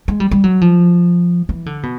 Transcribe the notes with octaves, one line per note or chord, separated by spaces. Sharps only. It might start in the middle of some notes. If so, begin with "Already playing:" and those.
G#3
G3
G3
F#3
F3
E3
D3
B2